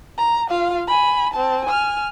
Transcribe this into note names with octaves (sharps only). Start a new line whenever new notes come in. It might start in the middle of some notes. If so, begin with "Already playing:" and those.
A#5
F4 F5
G#5 B5
C4 A5
G#5 F6